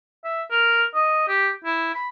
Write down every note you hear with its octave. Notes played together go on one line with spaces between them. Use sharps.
E5
A#4
D#5
G4
E4
B5